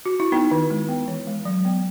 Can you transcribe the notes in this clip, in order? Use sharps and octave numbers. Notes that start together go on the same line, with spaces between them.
F#4
E4
B3 D#4
D#3
G#3
B3
E3
G#3
F#3
B3